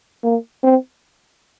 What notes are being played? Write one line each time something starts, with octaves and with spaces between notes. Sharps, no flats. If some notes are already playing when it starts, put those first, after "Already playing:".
A#3
C4